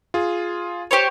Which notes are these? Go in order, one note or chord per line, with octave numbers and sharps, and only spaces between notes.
F4 G#4
G4 C5 C#5